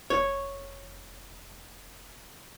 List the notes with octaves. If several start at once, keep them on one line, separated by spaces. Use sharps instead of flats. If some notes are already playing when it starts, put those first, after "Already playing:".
F1 C#5